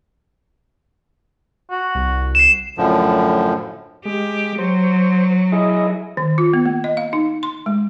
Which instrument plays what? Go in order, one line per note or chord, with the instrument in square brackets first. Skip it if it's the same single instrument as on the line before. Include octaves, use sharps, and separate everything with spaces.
[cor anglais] F#4
[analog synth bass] C2
[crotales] C7 E7
[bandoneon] F#2 A2 D3 F3
[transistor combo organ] G#3 [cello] G4
[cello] F#3 [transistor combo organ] C5
[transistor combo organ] E4 G#4 D#5
[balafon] D#3
F4
B3
A#3
D#5
F5
D#4
C6
G#3